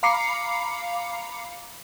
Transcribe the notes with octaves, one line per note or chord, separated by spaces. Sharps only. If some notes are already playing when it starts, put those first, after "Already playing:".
F5 A#5 B5 D6 C7 C#7